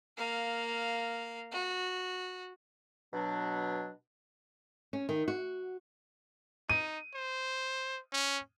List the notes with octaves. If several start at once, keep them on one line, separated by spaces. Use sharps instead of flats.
A#3 F5
F#4
B2 F#3 D4
C#4
D#3
F#4
D#4 D#7
C5
C#4